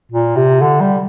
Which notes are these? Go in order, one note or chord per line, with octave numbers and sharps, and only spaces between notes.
A#2
C3
D3
G3